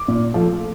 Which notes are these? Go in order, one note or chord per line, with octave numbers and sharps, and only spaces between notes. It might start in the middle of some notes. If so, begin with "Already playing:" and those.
Already playing: D6
A#2
F3 A3